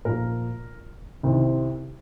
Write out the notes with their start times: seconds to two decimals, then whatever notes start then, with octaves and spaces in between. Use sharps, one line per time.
0.05 A#2 F3 A#3 A#4
1.23 C2 C3 D#3 C4